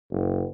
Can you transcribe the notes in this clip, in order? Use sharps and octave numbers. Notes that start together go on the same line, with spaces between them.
F#1